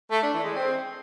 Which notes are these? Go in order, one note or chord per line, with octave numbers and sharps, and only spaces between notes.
A3
D4
E3
G#3
C4